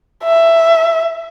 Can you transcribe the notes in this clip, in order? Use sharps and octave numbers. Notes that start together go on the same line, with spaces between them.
E5